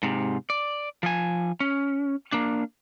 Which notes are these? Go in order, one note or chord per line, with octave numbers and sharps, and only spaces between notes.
G#2 C3
D5
F3 G#5
C#4
A#3 D4